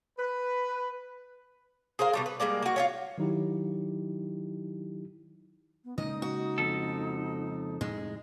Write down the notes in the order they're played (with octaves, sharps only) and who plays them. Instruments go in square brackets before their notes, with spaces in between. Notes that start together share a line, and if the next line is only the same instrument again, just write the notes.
[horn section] B4
[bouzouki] G#4 A#4 C5 F5
B2 G3 D4
B4
G3 G#3 A#3 D5
A#3 F#4
F4 G4 C#5
[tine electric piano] D#3 F#3 D#4 E4 G4
[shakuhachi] B3
[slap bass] C#3 G#3 A#3 [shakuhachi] D#4 [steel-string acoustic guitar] D#5
[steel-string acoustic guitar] F#4
[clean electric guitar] F2 A4
[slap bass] F2 A2 C3 [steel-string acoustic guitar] G#3